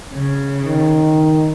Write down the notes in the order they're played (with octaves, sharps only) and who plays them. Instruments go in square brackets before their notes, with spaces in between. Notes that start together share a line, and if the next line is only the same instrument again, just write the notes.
[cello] C#3
[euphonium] D#3